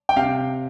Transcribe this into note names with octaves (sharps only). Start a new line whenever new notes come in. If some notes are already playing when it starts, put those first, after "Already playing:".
G5
C3 F5